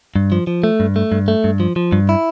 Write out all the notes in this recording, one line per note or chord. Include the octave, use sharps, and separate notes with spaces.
G2
F3
F3
A3
G2
A3
G2
A3
G2
F3
F3
G2
E4